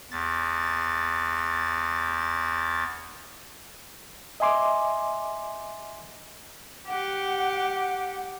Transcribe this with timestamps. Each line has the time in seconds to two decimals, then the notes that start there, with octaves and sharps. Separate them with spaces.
0.11 E2 A6
4.40 D#5 E5 G#5 C6 D6
6.88 G4 F#5